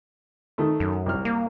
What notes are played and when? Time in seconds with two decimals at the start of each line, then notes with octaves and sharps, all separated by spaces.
0.58 D#3 A3
0.80 F#2
1.06 C2 F6
1.25 A#3